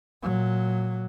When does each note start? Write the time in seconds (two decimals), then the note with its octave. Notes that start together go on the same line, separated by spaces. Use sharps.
0.22 A#2 F#3